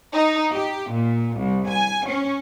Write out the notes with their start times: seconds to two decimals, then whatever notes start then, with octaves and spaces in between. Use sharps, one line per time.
0.13 D#4
0.53 G4
0.91 A#2
1.37 C2
1.68 G#5
2.07 C#4